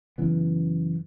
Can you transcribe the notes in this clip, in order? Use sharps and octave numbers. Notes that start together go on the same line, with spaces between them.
F#2 C#3 E3 B3